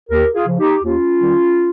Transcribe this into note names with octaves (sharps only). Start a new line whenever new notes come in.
D#2 G4 A#4
F4 G#4
C#3 F3
D#4 G4
D#2 C#4 F4
D#3 G3